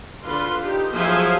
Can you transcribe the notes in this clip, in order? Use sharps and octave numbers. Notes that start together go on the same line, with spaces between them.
D3 F4 B4 C6
D#4 G4
F3 F#3 G#4 C5 E5 F5